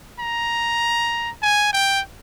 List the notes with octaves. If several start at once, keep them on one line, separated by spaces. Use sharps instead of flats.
A#5
G#5
G5